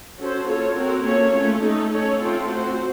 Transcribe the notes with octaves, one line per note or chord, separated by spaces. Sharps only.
C#4 F#4 A4 C5
A#3 F4 A4 C#5
C4 F#4 A#4
A#3 C#4 A4 C#5
A3 C#4 F4
A3 D#4 A4
C#4 A4 C#5
A3 C4 F4 A4
C4 F#4 C5